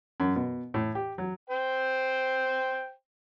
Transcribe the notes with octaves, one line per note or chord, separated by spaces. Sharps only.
F#2
B2
A2
G4
F#3
C5 G5